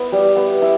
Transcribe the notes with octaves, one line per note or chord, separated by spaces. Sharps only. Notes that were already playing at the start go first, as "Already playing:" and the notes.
Already playing: B3 E4
G3
B3
E4